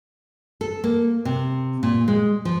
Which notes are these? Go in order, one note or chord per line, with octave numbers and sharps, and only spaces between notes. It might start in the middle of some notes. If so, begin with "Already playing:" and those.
A4
A#3
C3
A#2
G#3
F3